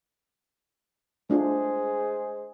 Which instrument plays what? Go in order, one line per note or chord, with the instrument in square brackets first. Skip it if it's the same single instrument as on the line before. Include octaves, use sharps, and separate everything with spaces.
[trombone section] G#3 G#4 C5 [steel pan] A3 D4 F4